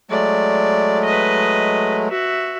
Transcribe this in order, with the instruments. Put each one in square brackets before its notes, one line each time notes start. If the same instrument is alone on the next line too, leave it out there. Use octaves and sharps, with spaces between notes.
[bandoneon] F#3 G#3 A3 [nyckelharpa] D5
[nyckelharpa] B4 D#5
F#4 E5